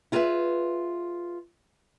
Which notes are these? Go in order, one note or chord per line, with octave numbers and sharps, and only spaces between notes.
E4 F4 G#4 A#4 B4 E5